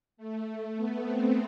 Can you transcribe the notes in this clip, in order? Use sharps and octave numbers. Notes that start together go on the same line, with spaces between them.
A3
A3
B3
C4